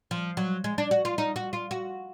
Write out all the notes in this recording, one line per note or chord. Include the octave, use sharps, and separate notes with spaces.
F3
F#3
G#3
D4
F#4
F4
D#4
F#4
F4
F#4